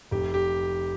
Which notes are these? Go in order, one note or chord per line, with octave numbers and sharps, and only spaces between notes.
F1 G4
G4